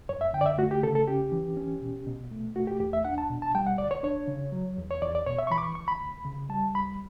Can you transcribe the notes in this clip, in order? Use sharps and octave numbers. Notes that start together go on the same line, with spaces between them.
F#2 C#5
E5
D3 G5
D5
E5
A3 F#4
G4
C#3 A4
A4
C#4 G4
E3
C#4
B2
B2
A3
A3 F#4
G4
E2 G4
E5
D4 F#5
A5
B2
A5
G3 G5
F#5
D2 D5
C#5
D4 C#5
C#3
F#3
E2
C#5
E2 D5
D5
B2 C#5
E5
C#6
E3 B5
D6
C#6
D2 C#6
B5
D2
C#3
G3 A5
C#2 B5